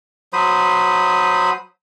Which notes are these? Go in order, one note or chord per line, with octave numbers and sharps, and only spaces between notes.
F#3 C5 B5 D#6